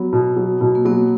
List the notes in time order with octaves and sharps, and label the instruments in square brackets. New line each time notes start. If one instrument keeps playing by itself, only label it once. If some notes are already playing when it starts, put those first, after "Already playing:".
Already playing: [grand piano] F#3 [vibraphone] B3
[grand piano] B2
F#3
B2
[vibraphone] A#3
[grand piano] F#3 [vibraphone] B3